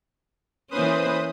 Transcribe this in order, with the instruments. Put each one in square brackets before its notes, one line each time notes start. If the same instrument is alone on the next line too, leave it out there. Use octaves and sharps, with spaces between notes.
[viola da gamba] E3 A#3 C#4 [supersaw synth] B4 C5 D#6